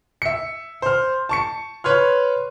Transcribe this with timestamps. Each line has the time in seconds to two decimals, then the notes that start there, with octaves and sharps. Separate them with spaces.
0.22 E5 C#7
0.82 C5 F6
1.29 A5 C#6 C#7
1.84 B4 C#5 C6 F6